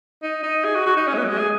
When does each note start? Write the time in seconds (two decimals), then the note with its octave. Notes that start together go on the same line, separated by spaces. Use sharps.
0.23 D#4
0.43 D#4
0.65 G#4
0.76 F#4
0.86 F#4
0.97 D#4
1.07 C#4
1.14 G#3
1.18 B3
1.24 F#3
1.29 G#3
1.39 G#4